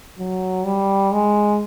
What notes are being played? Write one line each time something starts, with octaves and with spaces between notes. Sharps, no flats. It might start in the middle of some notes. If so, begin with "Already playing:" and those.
F#3
G3
G#3